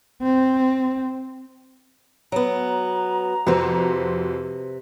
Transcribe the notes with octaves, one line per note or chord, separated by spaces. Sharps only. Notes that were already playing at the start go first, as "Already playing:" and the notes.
C4
F#3 B3 A#5
F2 C3 F#4 B4 C5